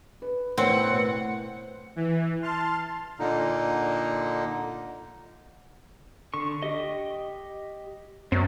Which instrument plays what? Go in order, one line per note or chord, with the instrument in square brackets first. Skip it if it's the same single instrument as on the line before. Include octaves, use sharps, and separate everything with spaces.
[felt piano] B4
[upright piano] A2 [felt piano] B3 A#4 C#5 [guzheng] C4 [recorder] F#5
[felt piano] B2
[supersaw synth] E3
A5 C6 F6
[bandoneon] A#2 D3 D#4
[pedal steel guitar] D3 C#6
G4 D#5
[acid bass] F#2 [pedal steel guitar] C4 D5